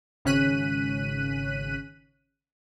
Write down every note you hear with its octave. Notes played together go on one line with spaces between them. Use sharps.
G#1 C#3 C#4 F#6 B6 D#7